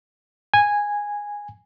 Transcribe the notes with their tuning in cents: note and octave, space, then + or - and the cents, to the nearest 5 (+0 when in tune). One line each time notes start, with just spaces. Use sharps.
G#5 -10